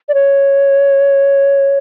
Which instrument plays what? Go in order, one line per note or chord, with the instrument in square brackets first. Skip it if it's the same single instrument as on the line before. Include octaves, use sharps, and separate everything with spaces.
[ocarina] D5
C#5